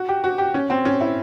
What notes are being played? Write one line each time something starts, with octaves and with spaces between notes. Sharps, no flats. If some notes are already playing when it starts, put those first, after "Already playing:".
Already playing: F#4
G4
F#4
G4
C#4
C4
C#4
E4